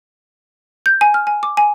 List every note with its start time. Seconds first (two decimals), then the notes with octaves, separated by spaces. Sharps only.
0.86 G6
1.01 G#5
1.14 F6
1.27 G#5
1.43 D6
1.57 G#5